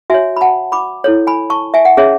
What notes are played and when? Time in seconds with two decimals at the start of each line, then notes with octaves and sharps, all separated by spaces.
0.10 F#4 C#5 E5 G#5
0.37 B5
0.41 F#5 A5
0.72 B5 D6
1.04 E4 A4 C#5
1.27 G#5 B5
1.50 A5 C#6
1.74 E5 G#5
1.85 F#5
1.97 C#4 G#4 C#5 E5